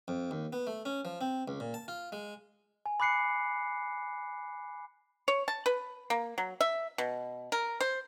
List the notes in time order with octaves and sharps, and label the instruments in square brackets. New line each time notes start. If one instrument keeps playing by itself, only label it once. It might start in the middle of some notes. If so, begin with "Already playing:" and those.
[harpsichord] F2
D#2
B3
A3
C#4
F3
C4
C#2
A#2
A5
F4
G#3
[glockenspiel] G#5
B5 D6 F#6 C7 C#7
[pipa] C#5
A5
B4
A#3
F#3
E5
B2
A#4
C5